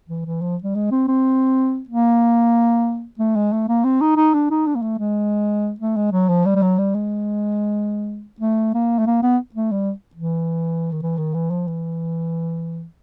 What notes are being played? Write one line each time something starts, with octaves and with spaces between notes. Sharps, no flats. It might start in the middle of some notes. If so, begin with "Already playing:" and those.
E3
E3
F3
G3
G#3
C4
C4
A#3
A3
G#3
A3
A#3
C4
D#4
D#4
D4
D#4
D4
A#3
A3
G#3
A3
G#3
F#3
F3
G3
G3
F#3
G3
G#3
A3
A#3
A3
A#3
B3
A3
G3
E3
D#3
E3
D#3
E3
F3
E3